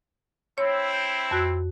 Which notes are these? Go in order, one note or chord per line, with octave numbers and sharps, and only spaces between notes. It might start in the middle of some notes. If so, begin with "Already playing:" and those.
C4 E4 C#5
G6
F2 F#4 F#6